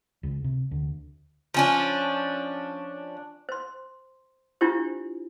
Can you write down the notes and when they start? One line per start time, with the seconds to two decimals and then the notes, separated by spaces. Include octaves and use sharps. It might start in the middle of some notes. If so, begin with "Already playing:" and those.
0.23 C#2
0.44 C3
0.71 D2
1.54 F3 C#4 D4
3.49 C5 C6
4.61 D4 E4 F4 G4 C5